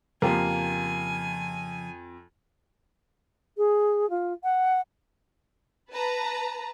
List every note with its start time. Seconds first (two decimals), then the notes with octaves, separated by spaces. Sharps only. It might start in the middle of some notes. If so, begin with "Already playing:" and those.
0.22 F2 C#3 F3 A#3 F4 G4 G#5 A5
3.57 G#4
4.09 F4
4.43 F#5
5.91 B4 A5 A#5